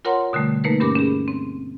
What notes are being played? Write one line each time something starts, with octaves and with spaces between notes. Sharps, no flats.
F4 A#4 C#5 F#5 A#5 C6
B2 D3 G3 A3
A3 A#3 D#4 A#4 B4
G2 C#4 G4 A#4 B5 D6
C#4 G#4
C4